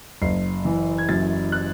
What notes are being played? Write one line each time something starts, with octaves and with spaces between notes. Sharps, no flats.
F#1 C7
E3
G#6
F#2 A6
F#6